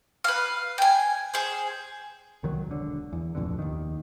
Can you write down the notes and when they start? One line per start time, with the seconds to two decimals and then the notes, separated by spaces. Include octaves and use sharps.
0.24 B4 F5
0.78 G5 G#5
1.34 G#4 C5
2.43 C2 D#3 F#3
2.67 E1 D3
3.13 E2
3.35 D1 F2 B2 D3
3.59 D#2 D#3